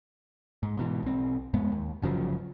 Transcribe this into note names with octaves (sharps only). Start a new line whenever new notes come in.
G#2
G#2 B2 E3
B1 C4
F2 A2 G#3 B3
D#2
G1 C#3 F3 F#3